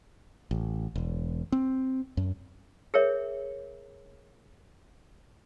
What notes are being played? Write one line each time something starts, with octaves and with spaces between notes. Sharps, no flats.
A1
E1
C4
F#2
G#4 A#4 C#5 E5